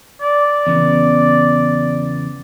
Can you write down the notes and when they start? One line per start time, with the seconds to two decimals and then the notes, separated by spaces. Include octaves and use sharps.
0.22 D5
0.67 E2 C#3 B3